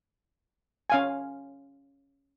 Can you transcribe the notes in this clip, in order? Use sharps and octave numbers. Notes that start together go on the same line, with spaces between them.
C#4 F5 G#5